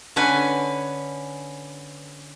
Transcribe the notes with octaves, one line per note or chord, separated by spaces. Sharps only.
D3 C#4 B4 G#5